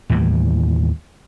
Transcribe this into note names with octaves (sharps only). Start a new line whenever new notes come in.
D#2 A2 E3 G3